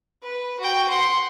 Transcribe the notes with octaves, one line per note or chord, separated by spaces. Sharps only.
B4
F#4 G5
F#5 C6